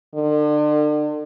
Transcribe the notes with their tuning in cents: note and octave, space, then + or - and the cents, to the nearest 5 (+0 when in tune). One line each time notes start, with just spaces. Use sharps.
D3 +35